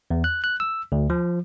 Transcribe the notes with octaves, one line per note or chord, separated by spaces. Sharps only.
E2
F#6
F#6
E6
D2
F3